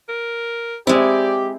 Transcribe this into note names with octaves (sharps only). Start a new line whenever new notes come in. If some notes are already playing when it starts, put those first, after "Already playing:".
A#4
G#3 C4 E4 G4 D5